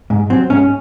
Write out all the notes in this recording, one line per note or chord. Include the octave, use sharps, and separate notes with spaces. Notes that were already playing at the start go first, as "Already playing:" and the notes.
G#2
F#3 C4
G#2 C#4